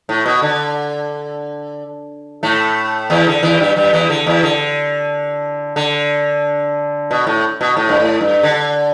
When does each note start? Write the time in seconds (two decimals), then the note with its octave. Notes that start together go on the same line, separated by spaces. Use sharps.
0.09 A2
0.26 B2
0.42 D3
2.43 A2 A3
3.10 E2 E3
3.27 D3
3.43 E2 E3
3.60 G2 G3
3.76 G2 G3
3.93 E2 E3
4.10 D3
4.26 E2 E3
4.43 D3
5.76 D3
7.11 B2
7.27 A2
7.61 B2
7.77 A2
7.89 G2
8.00 A2
8.21 G2
8.43 D3